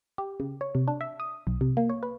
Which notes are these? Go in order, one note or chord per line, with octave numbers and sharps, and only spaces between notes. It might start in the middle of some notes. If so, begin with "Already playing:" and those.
G4
C#3
C#5
C3
D4
E5
D#6
B1
C3
A#3
C#5
B4